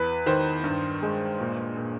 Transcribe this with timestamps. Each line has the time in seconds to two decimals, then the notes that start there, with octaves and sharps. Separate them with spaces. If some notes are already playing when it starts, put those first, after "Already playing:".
Already playing: E2 B4
0.26 D#3 C5
0.64 G2
1.02 G#3
1.40 A#2
1.77 A#2